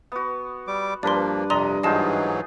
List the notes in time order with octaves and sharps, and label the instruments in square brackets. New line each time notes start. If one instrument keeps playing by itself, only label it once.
[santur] B3 F#4
[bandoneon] G3 D6
[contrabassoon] G2 [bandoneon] F3 A#3 [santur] D4 A#4 B4 [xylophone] D5 C6
[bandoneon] F2 C3 [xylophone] D5 A#5 C6 [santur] D#5
[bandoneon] G#2 E3 F#3 [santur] D#4 F4 G#4 [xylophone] D#5 A5